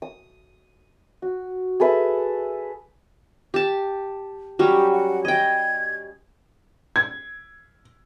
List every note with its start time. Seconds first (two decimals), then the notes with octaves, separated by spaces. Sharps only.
0.02 D#6
1.22 F#4
1.80 G#4 A4 B4 E5
3.54 G4 A5
4.59 F#3 G3 C#4 G4
4.92 F#5
5.25 D#5 G5 G#6
6.96 G#6